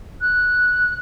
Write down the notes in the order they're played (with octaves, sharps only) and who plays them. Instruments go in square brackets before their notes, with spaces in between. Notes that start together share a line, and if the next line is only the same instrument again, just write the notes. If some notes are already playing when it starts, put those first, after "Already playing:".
[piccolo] F#6